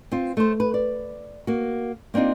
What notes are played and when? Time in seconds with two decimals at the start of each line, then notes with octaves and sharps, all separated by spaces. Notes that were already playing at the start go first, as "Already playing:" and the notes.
0.12 C4 F4
0.37 A3 C5
0.60 B4
0.74 D5
1.47 A#3 F#4
2.14 A#3 C4 D4 D#4 F4